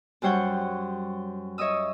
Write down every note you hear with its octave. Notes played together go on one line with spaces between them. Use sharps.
F#2 G3 C5 C#5 F#5 G6
C#5 D#5 E5 D#6 E6